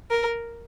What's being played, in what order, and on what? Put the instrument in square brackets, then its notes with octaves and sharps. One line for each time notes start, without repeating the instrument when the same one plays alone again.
[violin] A#4